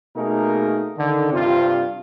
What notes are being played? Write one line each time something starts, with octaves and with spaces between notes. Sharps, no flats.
B2 A3 A#3 D#4 G#4 A#4
D3 D#3
G2 C3 C4 F4